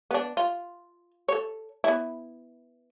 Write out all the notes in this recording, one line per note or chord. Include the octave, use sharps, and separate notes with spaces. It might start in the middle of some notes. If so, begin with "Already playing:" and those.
B3 D4
F4
A4 C#5
B3 E4